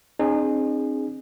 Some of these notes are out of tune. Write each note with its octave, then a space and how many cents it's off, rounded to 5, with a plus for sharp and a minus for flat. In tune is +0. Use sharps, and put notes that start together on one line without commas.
C4 +30 D#4 -40 G#4 -5